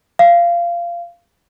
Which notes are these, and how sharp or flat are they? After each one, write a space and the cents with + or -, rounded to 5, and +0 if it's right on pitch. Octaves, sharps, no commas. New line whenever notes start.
F5 -20